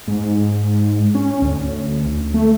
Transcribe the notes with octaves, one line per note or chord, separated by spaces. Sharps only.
G#2
C#4
D2
A3